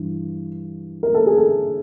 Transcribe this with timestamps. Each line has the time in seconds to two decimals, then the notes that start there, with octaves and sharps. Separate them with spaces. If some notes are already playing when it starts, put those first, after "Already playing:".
Already playing: G2 E3
1.03 A#4
1.14 A4
1.27 G#4
1.37 A4